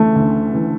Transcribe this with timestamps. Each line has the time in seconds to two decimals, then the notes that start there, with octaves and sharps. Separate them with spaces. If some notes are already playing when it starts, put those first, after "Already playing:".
Already playing: D2 C#3 E3 A3
0.16 D2
0.52 C#3 E3